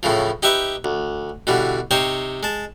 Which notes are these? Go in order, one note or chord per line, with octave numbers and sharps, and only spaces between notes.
A2 C#3 E3 F3
D#4 G4 B4 E5 C#6 D6
D2
B2 D3 E3 G3
C3 D#4 C5 C#5 G5
G#3 A5